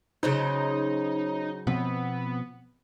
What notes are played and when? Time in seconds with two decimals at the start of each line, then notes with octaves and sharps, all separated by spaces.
0.23 C#3 F#3 D#4 C5
1.67 B2 F3 B3 C4